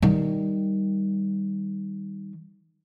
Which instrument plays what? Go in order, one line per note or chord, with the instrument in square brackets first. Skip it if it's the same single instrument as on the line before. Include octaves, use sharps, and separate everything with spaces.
[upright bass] D#3 G3